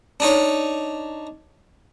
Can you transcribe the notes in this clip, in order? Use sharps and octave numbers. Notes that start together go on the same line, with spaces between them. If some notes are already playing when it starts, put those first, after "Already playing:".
D4 D#4 C#5